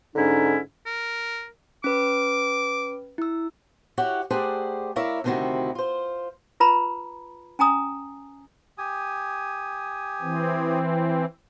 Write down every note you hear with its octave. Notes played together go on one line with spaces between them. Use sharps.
G#2 D3 C#4 D#4 E4
A#4
C#4 B4 D6
E4 E6
E4 F#4 G4 C#5 F#5
A3 G4 G#4 C5 D5 F#5
E4 A#4 C#5 D5 E5 F5
D2 C3 D#3 C4 E4 F#4
F4 C5
F4 B4 A#5 B5
C#4 G#5 A#5 D#6
G4 G#5 D#6
E3 C4